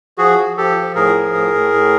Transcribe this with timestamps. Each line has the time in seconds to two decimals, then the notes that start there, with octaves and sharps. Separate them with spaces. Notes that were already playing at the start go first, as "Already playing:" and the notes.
0.18 F3 F#4 G#4
0.38 F3
0.57 F3 G4 A4
0.77 F3
0.95 A2 G#4 A#4
1.15 F3
1.35 A2
1.54 A2
1.74 A2